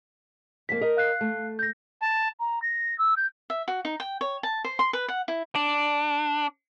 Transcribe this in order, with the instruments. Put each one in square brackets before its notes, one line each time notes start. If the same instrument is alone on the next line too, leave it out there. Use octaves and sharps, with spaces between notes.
[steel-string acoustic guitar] F2 A#3 [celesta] B6
[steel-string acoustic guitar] A#4 D#5
[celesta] F5 F#6 C7
[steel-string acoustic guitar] A3
[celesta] G6 A#6
[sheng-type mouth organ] A5
[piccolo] A#5
A#6
E6
G6
[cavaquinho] E5
F#4
D#4
G5
C#5
A5
C5
C6
B4
F#5
E4
[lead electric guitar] D4